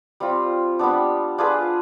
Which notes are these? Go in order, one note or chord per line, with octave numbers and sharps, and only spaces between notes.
G3 C4 F4
G3 B3 D4
D4 F4 G#4 B4